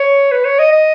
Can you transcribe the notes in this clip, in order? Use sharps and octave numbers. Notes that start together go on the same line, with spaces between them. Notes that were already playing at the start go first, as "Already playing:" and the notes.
Already playing: C#5
B4
C#5
D#5
D#5